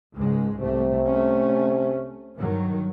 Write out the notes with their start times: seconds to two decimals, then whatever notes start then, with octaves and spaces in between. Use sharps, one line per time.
0.17 C#2 G#2 G#3
0.60 C2 C3 A3
1.08 A3 C#4
2.36 G2 D#3 F#3